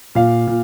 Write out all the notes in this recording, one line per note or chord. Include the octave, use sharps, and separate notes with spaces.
A#2 F5
A#2